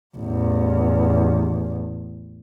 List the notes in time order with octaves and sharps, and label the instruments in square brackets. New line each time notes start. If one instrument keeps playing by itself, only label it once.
[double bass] A1 E2